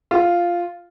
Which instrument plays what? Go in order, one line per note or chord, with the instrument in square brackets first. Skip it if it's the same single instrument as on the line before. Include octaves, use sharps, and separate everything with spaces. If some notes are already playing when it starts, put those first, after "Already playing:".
[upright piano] F4